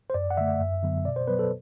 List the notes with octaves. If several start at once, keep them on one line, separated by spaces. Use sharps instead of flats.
C5
F#2 D5
F#5
D3 A3 E5
F#2
D3 F#3 B3
B2 D5
C5
F#3 B3 B4
A4